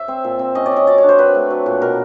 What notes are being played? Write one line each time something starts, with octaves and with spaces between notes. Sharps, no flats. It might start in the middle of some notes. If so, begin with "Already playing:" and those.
Already playing: E5
C4
A#2
C4
C#4 D#5
D5
C#4 D#5
F#3 D5
C#5
D4
C5
C4 B4
A3
F#3
A#2
B2 A#4